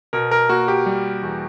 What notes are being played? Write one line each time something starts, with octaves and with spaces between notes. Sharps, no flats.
B2 A#4
A#4
A#3 F#4
G4
G3
E2